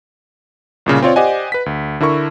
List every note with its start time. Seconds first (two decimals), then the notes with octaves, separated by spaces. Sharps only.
0.86 C2 A#2 C#3
1.02 C4 F4 C#5 D5
1.16 G4 C5 D5 D#5 F#5 G#5
1.52 B4 B6
1.66 D2
2.00 D3 E4 A#4 C#6